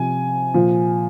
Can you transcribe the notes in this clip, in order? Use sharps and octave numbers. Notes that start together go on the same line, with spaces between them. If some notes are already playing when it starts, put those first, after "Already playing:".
Already playing: C3 F3 G#5
A#2 F3